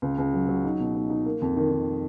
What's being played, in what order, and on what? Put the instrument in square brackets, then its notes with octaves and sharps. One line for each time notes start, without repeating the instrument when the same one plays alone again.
[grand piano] C#2
C#2
F#3
F#3
D#4
B2
D#4
D#4
A#3
F2
D#3
D#3